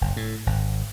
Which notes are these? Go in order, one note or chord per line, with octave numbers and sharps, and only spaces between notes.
F#1
A2
G#1